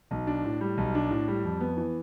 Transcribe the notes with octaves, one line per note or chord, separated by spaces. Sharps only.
B1
D4
A2
G3
B1
D4
A2
G3
F2
B3
E3